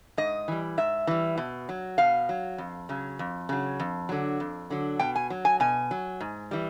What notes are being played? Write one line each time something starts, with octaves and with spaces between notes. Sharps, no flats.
G#2 D#5
E3 G3
G#2 E5
E3 G3
B2
F#3
B2 F5
F#3
F2
C#3 F#3
F2
C#3 F#3
F2
D3 F#3
F2
D3 F#3
B2 G5
G#5
F#3
G#5
B2 G#5
F#3
G#2
E3 G3